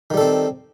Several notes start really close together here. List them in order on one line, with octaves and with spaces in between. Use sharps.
D#3 G3 A4 C4